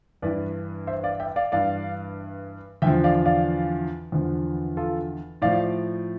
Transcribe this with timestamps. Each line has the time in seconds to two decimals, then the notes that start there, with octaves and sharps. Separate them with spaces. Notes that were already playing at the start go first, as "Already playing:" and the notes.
0.22 G2 E3 B4 D5
0.87 C5 E5
1.04 D5 F5
1.20 E5 G5
1.36 D5 F5
1.52 G2 E3 D5 F5
2.82 E2 D3 F3 E5 G5
3.04 D5 F5
3.26 D5 F5
4.12 E2 D3 F3
4.77 F4 A4
5.42 A2 F3 D5 F5